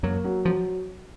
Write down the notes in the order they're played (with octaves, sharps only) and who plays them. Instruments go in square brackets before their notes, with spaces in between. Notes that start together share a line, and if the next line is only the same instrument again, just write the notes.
[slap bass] F#2 F#3 [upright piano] A#3
[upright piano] F#3
[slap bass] F3 [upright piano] F#3